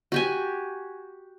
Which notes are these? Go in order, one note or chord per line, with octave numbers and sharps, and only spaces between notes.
F#4 G4 G#5